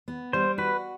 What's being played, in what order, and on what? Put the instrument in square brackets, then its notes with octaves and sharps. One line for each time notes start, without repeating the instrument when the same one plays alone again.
[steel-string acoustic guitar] B3
[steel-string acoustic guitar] G3 [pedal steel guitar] C5
[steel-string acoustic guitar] F#4 [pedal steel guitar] B4